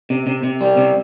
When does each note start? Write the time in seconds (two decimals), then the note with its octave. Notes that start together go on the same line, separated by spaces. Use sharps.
0.10 C3
0.27 C3
0.43 C3
0.61 G3
0.77 C3